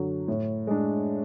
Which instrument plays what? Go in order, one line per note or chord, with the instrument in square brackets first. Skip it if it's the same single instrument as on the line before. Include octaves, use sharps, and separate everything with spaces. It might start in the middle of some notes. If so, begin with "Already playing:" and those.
Already playing: [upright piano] F#2 D3 F#3
A2
G#3 D4